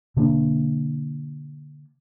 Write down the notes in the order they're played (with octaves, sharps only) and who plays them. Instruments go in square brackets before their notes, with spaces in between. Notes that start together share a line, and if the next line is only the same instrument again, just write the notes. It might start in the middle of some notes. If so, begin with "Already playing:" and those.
[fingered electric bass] B2 D3 A#3 D4